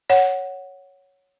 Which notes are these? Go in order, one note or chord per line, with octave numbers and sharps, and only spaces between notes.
C#5 F#5